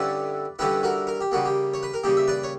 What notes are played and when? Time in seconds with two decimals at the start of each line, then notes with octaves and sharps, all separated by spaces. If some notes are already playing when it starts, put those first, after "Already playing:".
Already playing: G2 D3 G3 C#4 E4 B4 D5
0.59 G2 D3 G3 C#4 E4 G4 B4
0.83 F#4 A#4
1.07 A#4
1.21 G4
1.32 C#3 G3 A#3 F#4
1.45 G4
1.74 C#5
1.83 B4
1.94 A#4
2.04 C#3 G3 A#3 G4
2.17 E5
2.28 B4 D5
2.43 C#5